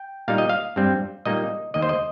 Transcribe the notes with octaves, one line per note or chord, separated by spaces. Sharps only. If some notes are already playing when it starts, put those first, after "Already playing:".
Already playing: G5
A#2 G3 D#4 F5
D#5
F5
G2 G3 C4
A#2 G3 A#3 D#4 D#5
D#2 D#3 A#3 D#5
C5
D#5